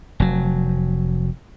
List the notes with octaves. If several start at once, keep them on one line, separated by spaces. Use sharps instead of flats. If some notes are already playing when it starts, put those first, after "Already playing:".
F1 F#3